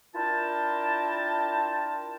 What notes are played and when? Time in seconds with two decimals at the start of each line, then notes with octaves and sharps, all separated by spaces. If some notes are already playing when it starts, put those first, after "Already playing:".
0.15 D4 E4 F4 A#4 G5 A5